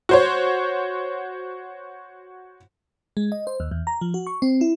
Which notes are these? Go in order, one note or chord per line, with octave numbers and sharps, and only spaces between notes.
F#4 C5 C#5
G#3
D#5
C5
D#2
E2
A#5
F3
F#4
C#6
C4
E4